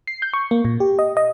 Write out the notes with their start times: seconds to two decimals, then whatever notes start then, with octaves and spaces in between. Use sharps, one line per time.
0.08 C7
0.22 G6
0.34 C#6
0.51 A#3
0.65 A#2
0.80 G4
0.99 D#5
1.17 D#5